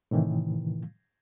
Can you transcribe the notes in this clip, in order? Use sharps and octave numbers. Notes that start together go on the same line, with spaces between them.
A2 C3 D#3 E3